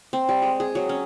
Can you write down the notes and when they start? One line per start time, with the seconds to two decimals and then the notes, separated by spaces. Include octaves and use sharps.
0.13 C4
0.29 G3
0.42 G#3
0.60 G#4
0.75 F#3
0.89 C#4